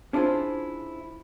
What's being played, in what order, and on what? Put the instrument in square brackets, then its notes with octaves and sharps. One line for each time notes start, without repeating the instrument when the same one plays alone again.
[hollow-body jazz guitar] C#4 D4 E4 F4 G#4 C5